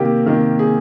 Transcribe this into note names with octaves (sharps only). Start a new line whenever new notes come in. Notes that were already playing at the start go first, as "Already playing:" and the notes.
Already playing: C3 D#3 A#3 G4 A#4
C3 D#3 A#3 A#4
G#4